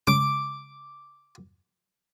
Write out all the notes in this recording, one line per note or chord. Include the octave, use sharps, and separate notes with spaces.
C#3 G#3 D6